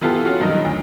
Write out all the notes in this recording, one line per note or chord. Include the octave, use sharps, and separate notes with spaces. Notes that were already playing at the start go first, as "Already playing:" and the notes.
E3 B3 F4 G4 A4
C#4 F4 F#4
G2 D#3 F3 F#3 D#4
D2